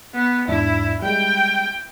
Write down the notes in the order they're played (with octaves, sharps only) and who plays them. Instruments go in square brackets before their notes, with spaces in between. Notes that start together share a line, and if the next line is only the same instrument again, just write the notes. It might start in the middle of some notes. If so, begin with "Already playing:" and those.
[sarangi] B3
[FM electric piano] E2 G#2 D4 [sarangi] E4
[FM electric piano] G3 G#3 [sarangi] G5